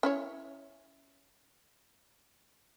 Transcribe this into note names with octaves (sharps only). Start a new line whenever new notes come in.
C#4 E4 C#5